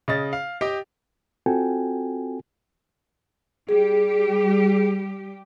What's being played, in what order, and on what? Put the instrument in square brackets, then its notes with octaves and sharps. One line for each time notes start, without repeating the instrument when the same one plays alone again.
[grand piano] C#3 D#5 A6
F5
G4 D#5 G5
[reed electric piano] C4 F4 F#4 A4 G5 G#5
[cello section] G3 G4 [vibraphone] G#4